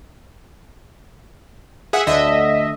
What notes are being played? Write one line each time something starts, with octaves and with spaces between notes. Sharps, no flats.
G#4 E5 F#5
D2 D3 D#5 E5